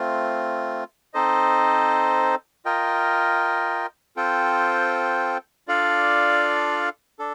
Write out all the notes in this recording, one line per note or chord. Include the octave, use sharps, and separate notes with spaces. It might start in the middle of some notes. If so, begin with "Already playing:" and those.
Already playing: A3 C4 F4
C4 D#4 A4 C5 D#5
F4 A#4 D#5 G5
C4 F4 A4 C5 G5
D4 F4 A4 D5 F5
D4 A4